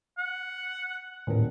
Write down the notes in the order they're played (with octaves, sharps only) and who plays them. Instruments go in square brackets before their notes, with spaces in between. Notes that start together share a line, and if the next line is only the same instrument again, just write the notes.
[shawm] F#5
[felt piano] D#1 A#4 [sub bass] A2